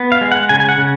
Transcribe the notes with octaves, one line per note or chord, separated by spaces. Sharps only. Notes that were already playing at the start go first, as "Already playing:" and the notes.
Already playing: B3
F5
G#3
F#5
C#3 G#5
G#5
F#5
C#3